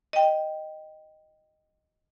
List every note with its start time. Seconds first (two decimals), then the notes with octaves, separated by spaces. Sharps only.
0.13 D#5 G5